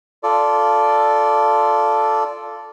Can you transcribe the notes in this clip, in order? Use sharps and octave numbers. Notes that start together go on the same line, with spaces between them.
F4 A4 D5